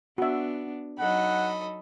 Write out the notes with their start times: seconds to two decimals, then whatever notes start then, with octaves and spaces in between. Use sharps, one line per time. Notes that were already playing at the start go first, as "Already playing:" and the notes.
0.18 B3 D4 F#4 E5
0.99 F#3 D#4 A4 D#5 F#5 B5